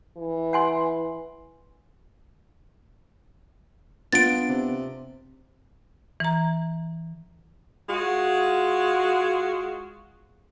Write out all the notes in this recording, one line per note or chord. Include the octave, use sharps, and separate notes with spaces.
E3
F#5 G#5 C6
B3 D4 F4 A6 D7
C3
E3 A#5
G#3 F4 F#4